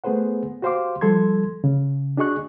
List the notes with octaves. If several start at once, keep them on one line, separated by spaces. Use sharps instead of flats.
A3 B3 G#4 B4 C5 F#5
F#4 G4 C5 F5 C6 D6
F3 G3 A4 C6 G#6
C#3
D4 F#4 G#4 D#5 C#6 F#6